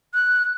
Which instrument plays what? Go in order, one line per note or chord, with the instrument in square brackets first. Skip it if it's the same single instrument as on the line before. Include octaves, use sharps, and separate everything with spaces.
[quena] F#6